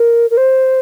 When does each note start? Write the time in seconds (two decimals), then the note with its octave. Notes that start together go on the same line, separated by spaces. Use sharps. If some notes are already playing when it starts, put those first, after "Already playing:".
Already playing: A#4
0.31 A#4
0.37 C5